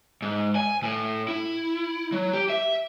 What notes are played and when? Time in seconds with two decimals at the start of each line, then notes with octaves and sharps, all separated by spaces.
0.22 G#2
0.56 G#5
0.83 A2
1.28 E4
2.12 F#3
2.33 G4
2.50 E5